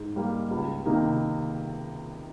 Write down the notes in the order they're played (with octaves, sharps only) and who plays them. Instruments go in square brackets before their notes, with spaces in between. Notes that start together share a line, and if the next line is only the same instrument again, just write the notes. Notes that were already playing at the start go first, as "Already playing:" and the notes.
Already playing: [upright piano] G#2
G3 A#3
C#2
C3 D#3 A#3 D#4